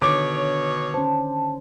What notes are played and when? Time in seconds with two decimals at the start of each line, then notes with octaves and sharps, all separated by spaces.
0.02 B2 D3 D#3 C#5 D6
0.94 C#4 C5 A5